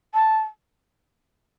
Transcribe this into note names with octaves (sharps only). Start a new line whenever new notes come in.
A5